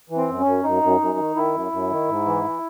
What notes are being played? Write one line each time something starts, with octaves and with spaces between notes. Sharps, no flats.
E3
C4
F#2
C#4
F#2
F#2 D#4
F#2
F#2
D#3
D#3 E4
F#2
F#2
D#3
G#2
E3
E3